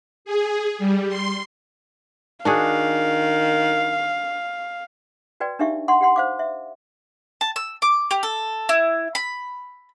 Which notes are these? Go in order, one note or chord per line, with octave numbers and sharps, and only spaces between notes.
G#4
G3
C6
D#3 D4 F#4 G#4 F5
F#4 B4 D5 G5
D4 D#4 G4 E5 F5 C#6
F#5 C6 C#6
G4 F#5 C6
C5 F5 D6
E5
A5
E6
D6
G4
A4
E4
B5